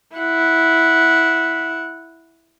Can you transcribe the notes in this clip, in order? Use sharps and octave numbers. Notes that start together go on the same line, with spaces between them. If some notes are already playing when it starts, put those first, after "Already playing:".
E4 F#5